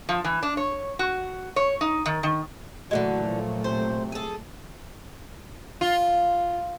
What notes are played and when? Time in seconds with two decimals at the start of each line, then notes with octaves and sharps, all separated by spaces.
0.09 F3
0.24 E3
0.43 D4
0.57 C#5
0.99 F#4
1.56 C#5
1.81 D#4
2.06 D#3
2.23 D#3
2.91 A#2 D3 E3 F#3 G#3 A3 F#4
3.26 F3
3.64 C3 C5
4.12 G#4 A4
5.81 F4